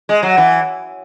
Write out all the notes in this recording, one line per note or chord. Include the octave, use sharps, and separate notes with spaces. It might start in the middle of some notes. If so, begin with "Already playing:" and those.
G#3
F#3
E3